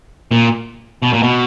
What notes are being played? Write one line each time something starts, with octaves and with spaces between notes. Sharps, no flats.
A#2
B2
A#2
B2